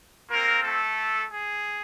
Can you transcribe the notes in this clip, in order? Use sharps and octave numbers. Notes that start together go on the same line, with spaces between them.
A#3 C4 F4 A#4
A3 A4
G#4